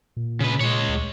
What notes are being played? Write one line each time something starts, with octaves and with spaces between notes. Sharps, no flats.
A#2
C#3 B4
A#2 G#3 C#5
D2